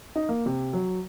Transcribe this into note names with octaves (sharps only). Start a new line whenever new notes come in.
D#4
A#3
C3
F#3